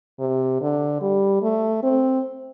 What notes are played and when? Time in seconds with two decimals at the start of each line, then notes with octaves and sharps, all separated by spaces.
0.19 C3
0.61 D3
1.01 G3
1.42 A3
1.83 C4